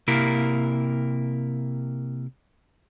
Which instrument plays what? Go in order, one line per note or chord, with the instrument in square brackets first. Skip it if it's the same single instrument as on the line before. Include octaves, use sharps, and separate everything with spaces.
[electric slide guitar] C3 A#3 E4 A#4